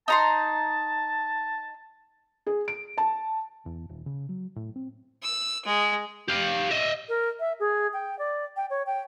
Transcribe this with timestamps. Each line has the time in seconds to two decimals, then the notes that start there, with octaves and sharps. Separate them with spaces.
0.08 D#4 A5 A#5 C6
2.47 G#4
2.68 D7
2.98 A5
3.66 E2
3.89 D#1
4.06 C#3
4.29 F#3
4.56 A2
4.76 C4
5.22 E6
5.65 G#3
6.28 G4 F5
6.71 D#5 E5
7.09 A#4
7.40 E5
7.60 G#4
7.93 G5
8.19 D5
8.57 G5
8.70 C#5
8.86 G5